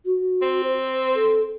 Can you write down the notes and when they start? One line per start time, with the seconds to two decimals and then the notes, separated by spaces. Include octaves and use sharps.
0.06 F#4
0.42 C4
0.64 C5
1.15 A4